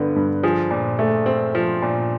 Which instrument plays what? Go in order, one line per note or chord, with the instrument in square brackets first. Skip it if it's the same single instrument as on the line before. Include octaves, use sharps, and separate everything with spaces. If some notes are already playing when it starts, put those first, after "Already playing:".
Already playing: [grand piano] G2 D3 G3 B3
G2
F3 G#4
A#2
A3
C4
F3
A#2